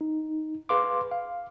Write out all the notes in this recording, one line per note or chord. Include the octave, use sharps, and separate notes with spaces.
D#4
G#4 B4 F5 C6 D6
F5